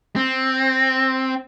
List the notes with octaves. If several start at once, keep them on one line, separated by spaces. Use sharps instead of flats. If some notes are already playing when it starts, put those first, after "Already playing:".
C4